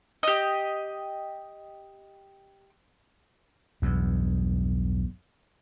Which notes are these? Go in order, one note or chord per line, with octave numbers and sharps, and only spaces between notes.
G4 D#5
B1 E2 G2